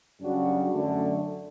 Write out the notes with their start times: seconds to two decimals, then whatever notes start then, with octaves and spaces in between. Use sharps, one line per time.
0.21 F#2 C#3 G3 D4 F#4
0.72 F#2 D3 A3